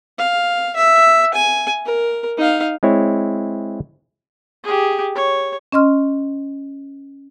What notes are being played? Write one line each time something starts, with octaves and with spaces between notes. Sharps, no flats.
F5
E5
G#5
A#4
D#4 F5
G#3 C4 E4 C#5
G4 G#4
C#5
C#4 D#5 C6 F6